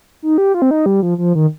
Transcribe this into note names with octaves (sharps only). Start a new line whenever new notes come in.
D#4
G4
F4
C4
D#4
G3
F3
F3
D#3